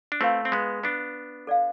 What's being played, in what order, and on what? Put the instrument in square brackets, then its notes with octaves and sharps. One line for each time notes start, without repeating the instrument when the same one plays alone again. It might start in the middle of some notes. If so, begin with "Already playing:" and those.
[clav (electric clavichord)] D4
[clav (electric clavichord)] A3 C4 [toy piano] F4 B4 F5 B5
[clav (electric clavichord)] C4
G#3 B3
B3 D4
[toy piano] A4 D5 F5